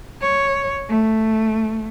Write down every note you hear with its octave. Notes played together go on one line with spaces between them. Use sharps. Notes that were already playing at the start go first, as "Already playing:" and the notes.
C#5
A3